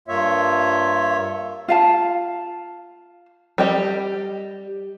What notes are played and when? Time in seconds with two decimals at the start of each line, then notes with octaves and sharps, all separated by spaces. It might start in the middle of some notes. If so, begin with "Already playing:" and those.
0.08 G2 A#3 F4 C#5 E5
1.68 F4 F5 A5
3.58 G3 G4 D#5